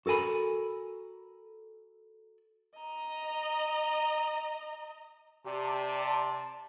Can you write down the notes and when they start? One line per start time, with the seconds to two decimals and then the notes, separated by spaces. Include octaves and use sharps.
0.06 F#4 A4 A#4 G#5 B5
2.77 D#5 A#5
5.46 C3 G4 D5 A5